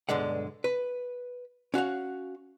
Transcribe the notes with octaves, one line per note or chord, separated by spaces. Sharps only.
B1 G2 D3 G#3 F#5
B4
C#4 F#4 F5 F#5